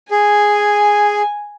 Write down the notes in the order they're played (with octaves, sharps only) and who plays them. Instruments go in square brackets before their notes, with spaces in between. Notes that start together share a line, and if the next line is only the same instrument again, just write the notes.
[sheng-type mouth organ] G#4 [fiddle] G#5